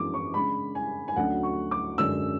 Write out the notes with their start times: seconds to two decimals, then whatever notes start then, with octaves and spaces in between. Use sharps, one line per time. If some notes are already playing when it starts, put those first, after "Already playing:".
Already playing: F#2 E3 G#3 B3 D4 D6
0.14 C#6
0.34 C#3 G#3 D4 B5
0.75 G#5
1.08 G#5
1.16 D2 D3 F#3 C#4 F#5
1.43 C#6
1.71 D6
1.98 F#2 D3 G#3 C#4 E6